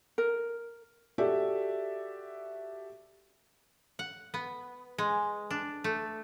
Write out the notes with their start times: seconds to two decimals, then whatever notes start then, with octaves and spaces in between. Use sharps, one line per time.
0.18 A#4
1.18 F#4 G4 A4 D5 E5
3.99 F#5
4.34 B3
4.98 G#3
5.51 D4
5.84 A3